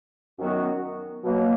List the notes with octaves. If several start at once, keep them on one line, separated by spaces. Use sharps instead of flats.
F#2 D#3 F#3 B3 F#4
B2 F#3 A#3